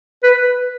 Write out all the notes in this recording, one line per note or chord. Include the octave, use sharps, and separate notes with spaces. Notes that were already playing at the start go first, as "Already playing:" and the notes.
B4